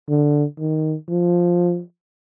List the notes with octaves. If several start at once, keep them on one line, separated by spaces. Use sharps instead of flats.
D3
D#3
F3